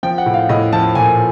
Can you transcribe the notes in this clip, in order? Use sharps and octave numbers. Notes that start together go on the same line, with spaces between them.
F3 G5
F#5
A2
F5
A2 D#5
F3 A5
A#2 G#5